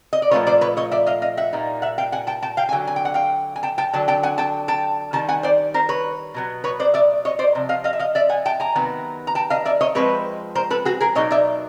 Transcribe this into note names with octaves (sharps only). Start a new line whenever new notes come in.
D#5
D5
A#2 F3 A3 C#4 F4 B4 C#5
C5 D5
B4 C#5
C#5 D#5
D5 E5
D#5 F5
D#5 F5
E5 F#5
A#2 G3 A#3 D#4
E5 F#5
F5 G5
F#5 G#5
G5 A5
G5 A5
F5 G5
G#5
D3 F#3 G5
G#5
G5
F#5
F5 G5
G#5
G5 A5
G5 A5
D3 F#3 A5
G5 A5
F#5 G#5
G5 A5
G5 A5
D#3 G3 A5
F#5 G#5
C5 D5
A#4 C5
B4 C#5
B2 F#3 B3
B4 C#5
C5 D5
D5 E5
C#5 D#5
C5 D5
C3 F3
D#5 F5
D#5 F5
E5
D#5 F5
D5 E5
F#5 G#5
G5 A5
G#5 A#5
C3 D#3 F#3 B3
A#5
G5 A5
D#5 F5
D5 E5
C#5 D#5
F3 G#3 C4 B4 C#5
A#4 C5
A4 B4
F#4 G#4
G#4 A#4
B2 F#3 A#3 D#4 C#5 D#5
D5 E5